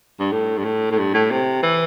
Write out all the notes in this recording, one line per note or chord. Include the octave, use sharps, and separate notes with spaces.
G2
A2
G2
A2
A2
G2
A2
C3
E3